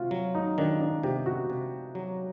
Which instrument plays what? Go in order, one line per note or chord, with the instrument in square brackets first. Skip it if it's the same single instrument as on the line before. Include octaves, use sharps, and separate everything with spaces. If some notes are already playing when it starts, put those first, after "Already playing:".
Already playing: [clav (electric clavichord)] C3 [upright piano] F4 F#4
[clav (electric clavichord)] F#3
[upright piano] D#4
[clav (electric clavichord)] D#3 [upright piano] D4
[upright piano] D#4
D4
[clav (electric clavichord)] C3 [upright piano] G4
[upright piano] F#4
[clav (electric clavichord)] C3
F#3